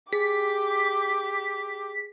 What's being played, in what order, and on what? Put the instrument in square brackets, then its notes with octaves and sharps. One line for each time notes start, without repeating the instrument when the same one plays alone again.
[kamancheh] G4 D6 [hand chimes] G#4 [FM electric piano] B6